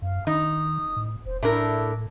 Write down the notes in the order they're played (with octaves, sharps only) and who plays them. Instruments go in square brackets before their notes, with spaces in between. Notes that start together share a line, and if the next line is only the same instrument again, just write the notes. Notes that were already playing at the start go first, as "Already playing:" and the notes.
[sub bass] F#2 [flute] F5
[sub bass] D#3 [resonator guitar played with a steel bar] D#4 [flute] D#6
[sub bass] A2
[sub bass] E1 [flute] C5
[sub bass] A2 [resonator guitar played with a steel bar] A3 D4 A#4 [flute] E4